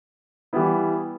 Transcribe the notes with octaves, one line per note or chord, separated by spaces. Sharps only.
E3 G3 B3 E4